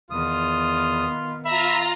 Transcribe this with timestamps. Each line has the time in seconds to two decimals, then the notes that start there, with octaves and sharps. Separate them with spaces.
0.11 E2 D#3 B3 F4 D#6
1.45 F4 E5 A#5 B5